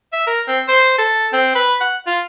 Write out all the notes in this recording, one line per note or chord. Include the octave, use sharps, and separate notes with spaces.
E5
A#4
C4
C5
A4
C4
B4
F#5
F4